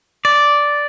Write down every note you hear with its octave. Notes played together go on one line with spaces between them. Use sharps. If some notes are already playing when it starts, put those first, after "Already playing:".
D5